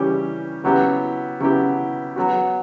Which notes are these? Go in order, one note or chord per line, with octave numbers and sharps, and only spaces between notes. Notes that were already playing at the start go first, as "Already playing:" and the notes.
Already playing: C#3 E3 G3 C#4 G4
C#3 F#3 B3 E4 G4
C#3 F#3 B3 E4 G4
F#3 B3 F#4